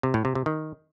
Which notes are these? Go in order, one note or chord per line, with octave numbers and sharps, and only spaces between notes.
C3
A2
C3
C3
D#3